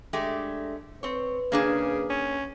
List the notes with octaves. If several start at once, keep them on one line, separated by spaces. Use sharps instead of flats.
G#3 A3 D4 G4
C4 B4 C#5
C#3 A#3 D4 G#4
C#4